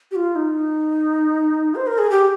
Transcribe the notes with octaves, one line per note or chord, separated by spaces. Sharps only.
G4
F4
D#4
C5
A#4
G#4
G4